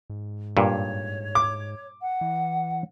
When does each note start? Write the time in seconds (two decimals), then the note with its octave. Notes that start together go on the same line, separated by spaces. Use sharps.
0.10 G#2
0.57 G2 A#2 C#5
1.35 D6
2.01 F#5
2.21 E3